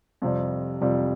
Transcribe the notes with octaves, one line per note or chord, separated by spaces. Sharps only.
F2 C3 G3
F2 C3 G3